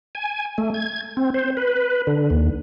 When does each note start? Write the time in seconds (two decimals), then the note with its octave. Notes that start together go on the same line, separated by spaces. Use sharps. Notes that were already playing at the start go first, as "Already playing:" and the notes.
0.15 G#5
0.58 A3
0.74 G#6
1.17 C4
1.34 C5
1.57 B4
2.07 D3
2.30 D#2